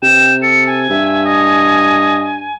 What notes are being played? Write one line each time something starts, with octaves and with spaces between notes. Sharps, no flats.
C3 G5 E7
A4 C#7
G#5
G2 E5
D#5